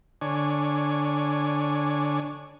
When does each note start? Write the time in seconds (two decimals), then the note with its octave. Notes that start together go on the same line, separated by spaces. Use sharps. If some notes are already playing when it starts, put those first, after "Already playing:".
0.21 D3 D4 C#5 G#5